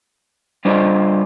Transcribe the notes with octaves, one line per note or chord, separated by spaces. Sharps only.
G3 D4 F4 C5 D#5